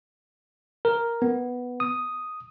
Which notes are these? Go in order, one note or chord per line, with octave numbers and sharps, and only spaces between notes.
A#4
B3
D#6